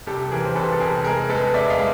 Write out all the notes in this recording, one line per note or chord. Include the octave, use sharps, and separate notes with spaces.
C2 G4 A4
E3 G#4 A#4
C5
C2 A4 B4
A4
C2 G#4 A#4
G#3 G#4 A#4
G#3 A4 B4
G#3 D5 E5
D#5 F5
G#3